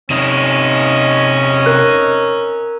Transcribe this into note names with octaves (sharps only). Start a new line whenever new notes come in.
C3 C#4 D#4 D#5
A#4 F#6